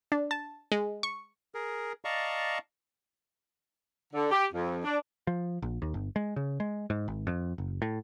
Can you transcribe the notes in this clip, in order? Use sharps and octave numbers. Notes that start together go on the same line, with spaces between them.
D4
A5
G#3
C#6
G#4 A#4
D5 D#5 F5 A5 A#5 C#6
D3
G4
F2
D4
F3
A#1
D#2
G1
G#3
C#3
G#3
G#2
G#1
F2
F#1
A2